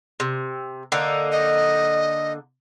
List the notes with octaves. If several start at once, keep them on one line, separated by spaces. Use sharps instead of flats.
C3
D3 A#3 D#4
D#5